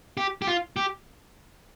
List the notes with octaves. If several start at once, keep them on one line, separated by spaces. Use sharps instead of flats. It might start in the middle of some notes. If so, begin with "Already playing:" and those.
G4
G4
F4
G4